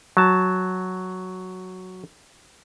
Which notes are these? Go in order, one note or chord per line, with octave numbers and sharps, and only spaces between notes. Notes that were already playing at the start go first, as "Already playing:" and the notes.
F#3 A5